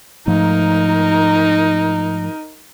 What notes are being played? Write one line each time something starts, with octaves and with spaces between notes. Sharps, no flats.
G#2 F3 A3 D#4 A#4